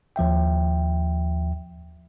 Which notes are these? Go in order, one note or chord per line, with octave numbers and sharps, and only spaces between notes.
D#2 F3 E5 G5